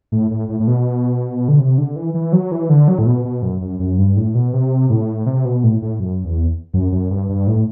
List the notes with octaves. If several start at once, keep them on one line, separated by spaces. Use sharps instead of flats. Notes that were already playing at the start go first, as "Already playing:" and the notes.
A2
A2
A2
A2
B2
D3
C3
D3
E3
E3
F#3
E3
D3
F#3
A2
B2
B2
F#2
F#2
F#2
G2
A2
B2
C3
A2
C3
B2
A2
A2
F#2
E2
F#2
F#2
G2
G2
A2